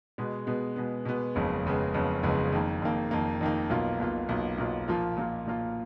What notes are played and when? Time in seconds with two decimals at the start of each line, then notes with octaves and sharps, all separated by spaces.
0.18 B2 G#3 B3
0.47 B2 G#3 B3
0.76 B2 G#3 B3
1.05 B2 G#3 B3
1.35 F#1 F2 C#3 G#3 B3
1.64 F#1 F2 C#3 G#3 B3
1.94 F#1 F2 C#3 G#3 B3
2.23 F#1 F2 C#3 G#3 B3
2.53 F2 D#3 A#3
2.82 F2 D#3 A#3
3.11 F2 D#3 A#3
3.41 F2 D#3 A#3
3.70 B1 B2 A#3 F4
3.99 B1 B2 A#3 F4
4.29 B1 B2 A#3 F4
4.58 B1 B2 A#3 F4
4.88 A#2 F3 A#3 F4
5.17 A#2 F3 A#3 F4
5.46 A#2 F3 A#3 F4